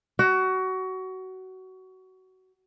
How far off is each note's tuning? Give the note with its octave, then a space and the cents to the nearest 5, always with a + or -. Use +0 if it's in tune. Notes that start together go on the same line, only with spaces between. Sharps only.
F#4 +20